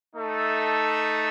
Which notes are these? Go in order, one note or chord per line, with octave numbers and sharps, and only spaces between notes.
A3 D#4 A4 E5